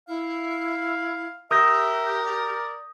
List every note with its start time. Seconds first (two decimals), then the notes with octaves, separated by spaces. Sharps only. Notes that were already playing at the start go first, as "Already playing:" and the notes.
0.08 E4 F5
1.51 G4 A#4 E5 D#6 G6 A#6
2.25 D5